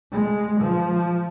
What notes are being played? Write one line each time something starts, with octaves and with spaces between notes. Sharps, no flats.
G#3
F3